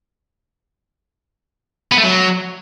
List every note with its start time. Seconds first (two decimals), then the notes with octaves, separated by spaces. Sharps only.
1.92 B3
1.98 A3
2.04 F#3